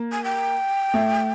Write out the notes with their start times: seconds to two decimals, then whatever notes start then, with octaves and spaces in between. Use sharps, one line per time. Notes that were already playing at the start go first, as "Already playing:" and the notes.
Already playing: A#3
0.12 G#5
0.24 G5
0.94 A3